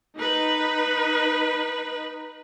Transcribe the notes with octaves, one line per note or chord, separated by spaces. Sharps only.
D#4 B4